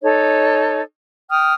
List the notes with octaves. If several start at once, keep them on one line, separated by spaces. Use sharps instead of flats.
D#4 A4 C#5
G5 D#6 F6